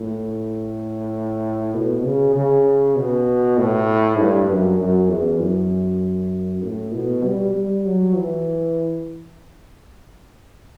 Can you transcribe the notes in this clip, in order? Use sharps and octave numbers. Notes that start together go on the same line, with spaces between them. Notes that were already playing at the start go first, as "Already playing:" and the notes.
Already playing: A2
B2
C#3
C#3
B2
A2
G2
F#2
F#2
E2
F#2
A2
B2
G3
G3
F#3
E3